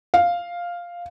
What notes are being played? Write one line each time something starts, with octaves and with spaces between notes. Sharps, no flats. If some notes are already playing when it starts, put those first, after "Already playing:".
F5